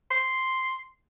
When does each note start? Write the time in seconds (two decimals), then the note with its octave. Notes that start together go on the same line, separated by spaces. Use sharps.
0.11 C6